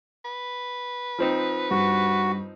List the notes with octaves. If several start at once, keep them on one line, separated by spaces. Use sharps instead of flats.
B4
F3 C4 D#4
G2 F#4